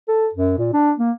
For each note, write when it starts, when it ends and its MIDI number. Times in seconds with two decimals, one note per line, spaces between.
0.08 0.28 69
0.33 0.54 42
0.58 0.70 46
0.73 0.91 62
0.98 1.12 58